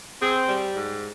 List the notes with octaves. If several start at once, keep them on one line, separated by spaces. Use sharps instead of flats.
C4 G#4
G3
G#2